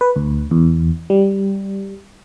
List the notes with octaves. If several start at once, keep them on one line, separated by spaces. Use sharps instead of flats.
B4
D2
E2
G3